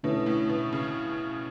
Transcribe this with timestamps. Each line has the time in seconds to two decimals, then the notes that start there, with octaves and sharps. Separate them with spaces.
0.03 B2 D3 A3 C#4 E4 A4
0.26 A2
0.50 B2
0.72 C#3